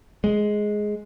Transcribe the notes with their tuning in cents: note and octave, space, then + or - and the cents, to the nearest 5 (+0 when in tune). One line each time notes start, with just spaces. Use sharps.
G#3 +10